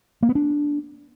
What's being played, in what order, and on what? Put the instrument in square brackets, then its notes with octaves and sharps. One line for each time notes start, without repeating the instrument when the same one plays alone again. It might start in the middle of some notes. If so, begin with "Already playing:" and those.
[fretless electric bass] A#3
B3
D4